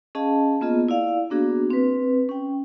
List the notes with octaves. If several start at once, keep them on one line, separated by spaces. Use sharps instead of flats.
C#4 G#4 D#5 F5 A5
A#3 B3 F4 G#4 D#5
E4 D5 F5
A#3 B3 D4 F#4 G#4
C4 B4
C#4 G5